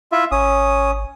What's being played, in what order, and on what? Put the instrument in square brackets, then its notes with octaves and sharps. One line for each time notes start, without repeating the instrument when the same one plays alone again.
[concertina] E4 F4 E5
[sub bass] G#1 [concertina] C#4 D#6